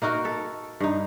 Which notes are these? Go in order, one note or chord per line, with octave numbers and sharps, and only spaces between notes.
A#3 D#4 F#4 A#4
A4
G2 D#4